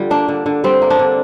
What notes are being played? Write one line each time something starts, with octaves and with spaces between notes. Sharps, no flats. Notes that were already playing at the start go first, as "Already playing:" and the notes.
Already playing: D3 G3 F4
A#3 D4
D3
D3
G3 C4
A#3
D4
D3